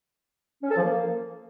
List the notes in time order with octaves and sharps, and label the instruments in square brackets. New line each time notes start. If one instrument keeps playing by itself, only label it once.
[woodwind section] C#4
A4
F3
A#3